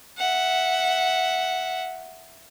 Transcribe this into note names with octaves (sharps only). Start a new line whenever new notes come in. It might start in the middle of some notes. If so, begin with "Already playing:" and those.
E5 F#5